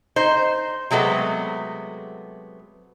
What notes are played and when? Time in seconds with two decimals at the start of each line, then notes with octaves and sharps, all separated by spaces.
0.16 D#4 C5
0.91 C3 F#3 G#3 A3 B3